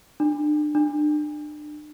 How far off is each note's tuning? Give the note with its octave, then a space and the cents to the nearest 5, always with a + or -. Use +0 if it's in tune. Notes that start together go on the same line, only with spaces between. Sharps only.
D4 +35
D4 +35